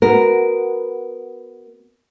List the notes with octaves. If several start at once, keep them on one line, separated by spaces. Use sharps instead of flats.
B3 F#4 A#4